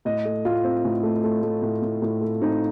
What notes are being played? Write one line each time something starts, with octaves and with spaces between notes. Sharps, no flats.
A2 D#5
A3
A2 F4
C4
A2
A3
A3
A3
A2
A2
A2
A3
C4 D#4